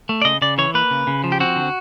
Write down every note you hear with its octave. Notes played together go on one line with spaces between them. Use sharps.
A3
D5
C#3 D#5
C#3 D5
E3 C#5
A#3 B4
C#3
C#3
F3
G4
C4 F#4
D3